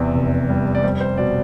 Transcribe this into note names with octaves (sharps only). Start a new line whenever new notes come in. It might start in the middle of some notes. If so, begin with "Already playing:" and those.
Already playing: E2 C3 D5
F1
G3
D5
G3 C5
C5
B2 D5